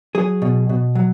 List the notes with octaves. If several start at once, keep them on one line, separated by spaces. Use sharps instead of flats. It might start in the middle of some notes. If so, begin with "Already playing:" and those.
F#3 G#4
B2
B2
F#3